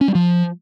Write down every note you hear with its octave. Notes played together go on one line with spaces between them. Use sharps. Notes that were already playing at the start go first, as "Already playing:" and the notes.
C#4
G3
F3